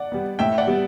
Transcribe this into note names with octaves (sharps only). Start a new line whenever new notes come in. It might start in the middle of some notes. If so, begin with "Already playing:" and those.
Already playing: D5 F#5
G3 B3
A2 E5 G5
D5 F#5
G3 B3